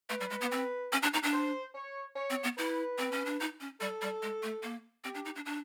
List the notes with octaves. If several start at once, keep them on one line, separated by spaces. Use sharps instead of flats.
A3 B4
G3
G#3
B3
C4
C#4
D4
D#4
D4
C5
C#5
C#5
C4
B3
E4 B4
C4
C#4
D4
D#4
C#4
G3 A4
G3
G#3
A3
A#3
C4 G4
D4
D#4
D4
D4